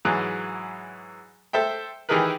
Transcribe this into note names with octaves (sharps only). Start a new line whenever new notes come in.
G#2 E3 F#3 G#4 F#6
A4 C5 E5 G5
D#3 E3 G4 G#4 A#4 B4